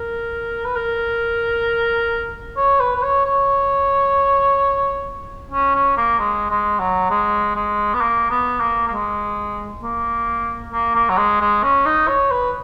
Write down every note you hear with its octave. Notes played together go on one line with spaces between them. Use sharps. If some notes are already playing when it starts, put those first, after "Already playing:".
Already playing: A#4
B4
A#4
C#5
B4
B4
C#5
C#5
C#4
C#4
A#3
G#3
G#3
F#3
G#3
G#3
B3
A#3
B3
A#3
A#3
G#3
A#3
A#3
A#3
F#3
G#3
G#3
C#4
D#4
C#5
B4